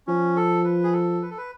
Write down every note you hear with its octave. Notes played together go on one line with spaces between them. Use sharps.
F3 C#4
A4
B4
G#4
A4
B4
A4
B4